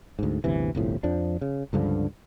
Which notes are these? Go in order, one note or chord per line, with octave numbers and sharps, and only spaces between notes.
D2 G#2
G1 D2 C3 E3
G1 C2 A2 F3
F2 F3 D4
C#3
C#2 G2 D3 F3